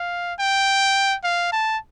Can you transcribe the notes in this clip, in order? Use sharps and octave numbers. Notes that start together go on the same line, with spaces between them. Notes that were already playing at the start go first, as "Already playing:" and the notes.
Already playing: F5
G5
F5
A5